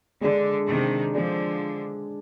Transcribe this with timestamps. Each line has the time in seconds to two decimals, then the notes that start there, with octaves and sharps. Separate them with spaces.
0.21 D3 G#3 D4 G#4 D5
0.68 C3 D#3
1.14 D3 F3 G#3 D4 G#4 D5